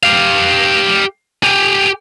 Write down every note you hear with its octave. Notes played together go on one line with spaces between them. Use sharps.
G4 F5
G4 G#5